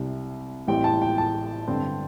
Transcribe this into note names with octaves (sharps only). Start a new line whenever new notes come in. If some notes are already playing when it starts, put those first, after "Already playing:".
Already playing: C2 C3 G3 C4
A1 A2 G3 C4 G5
A5
G5
A5
G2 D3 C4